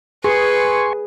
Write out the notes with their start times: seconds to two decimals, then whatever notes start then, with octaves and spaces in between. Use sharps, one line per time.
0.24 G#4 B4 G#5 C6 C#6